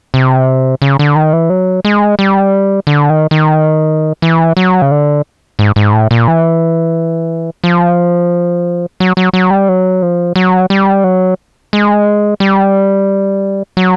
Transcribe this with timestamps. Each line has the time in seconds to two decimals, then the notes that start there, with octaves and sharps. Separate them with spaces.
0.14 C3
0.82 C#3
0.99 D3
1.16 D#3
1.33 E3
1.50 F#3
1.85 G#3
2.19 G3
2.87 D3
3.10 D#3
3.31 D#3
4.22 E3
4.57 F#3
4.82 C#3
4.91 D3
5.59 G#2
5.76 G#2
5.92 A2
6.11 A#2
6.28 E3
7.64 F3
9.00 F#3
9.17 F#3
9.33 F#3
9.51 G3
9.69 F#3
10.02 F3
10.36 F#3
10.70 G3
11.04 F#3
11.73 G#3
12.40 G3
13.77 F#3